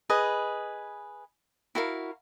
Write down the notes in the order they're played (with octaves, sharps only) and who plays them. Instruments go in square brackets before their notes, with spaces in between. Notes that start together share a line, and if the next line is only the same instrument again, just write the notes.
[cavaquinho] G#4 B4 D#5
E4 F#4 A#4 F5